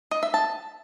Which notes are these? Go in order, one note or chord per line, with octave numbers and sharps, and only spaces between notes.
D#5
E5
A5